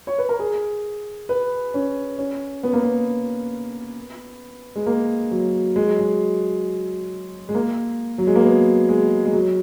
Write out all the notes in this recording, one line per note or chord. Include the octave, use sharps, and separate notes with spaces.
C#5
B4
A#4
G#4
B4
C#4
C#4
B3
A#3
B3
G#3
A#3
F#3
G#3
F#3
G#3
G#3
A#3
F#3
G#3
A#3
B3
G#3
G#3
F#3